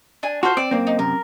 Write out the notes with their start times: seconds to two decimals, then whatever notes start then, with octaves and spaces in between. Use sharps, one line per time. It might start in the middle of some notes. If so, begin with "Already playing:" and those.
0.23 D4 G#5
0.43 F4 F#4 A4 C5
0.57 C4 D5
0.71 F#2 A#3 C4
0.87 D#4
0.99 F#2 C3 A#4